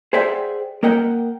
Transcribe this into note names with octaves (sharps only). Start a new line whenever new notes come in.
G#4 C5 D5 E5 F#5 G5
A#3 A#4 D#5 F#5 G5